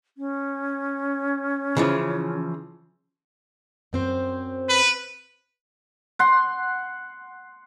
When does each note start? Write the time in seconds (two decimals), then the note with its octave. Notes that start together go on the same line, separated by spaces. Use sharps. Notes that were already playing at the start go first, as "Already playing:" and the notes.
0.18 C#4
1.77 C#3 E3 F3
3.93 F#2 C4 C5
4.69 B4
6.19 F#5 C6